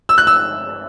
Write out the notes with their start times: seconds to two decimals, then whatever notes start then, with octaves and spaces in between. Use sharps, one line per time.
0.09 E6
0.18 F#6
0.27 E6